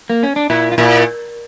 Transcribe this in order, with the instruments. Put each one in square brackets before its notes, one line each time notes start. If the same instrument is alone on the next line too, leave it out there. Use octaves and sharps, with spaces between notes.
[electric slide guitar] A#3
C#4
D4
[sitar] A#2 [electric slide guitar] E4
[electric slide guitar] F4
[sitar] A#2 [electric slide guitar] E4